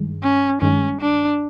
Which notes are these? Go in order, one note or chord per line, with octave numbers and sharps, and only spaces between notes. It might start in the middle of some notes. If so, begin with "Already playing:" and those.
Already playing: G2 D#3 G#3
C#4
G2 D#3 G#3 C#4
D4